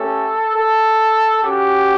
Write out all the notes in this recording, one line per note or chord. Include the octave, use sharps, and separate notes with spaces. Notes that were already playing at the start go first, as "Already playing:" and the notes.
Already playing: A3 C#4 G4 A4
A4
C#4 F#4 G4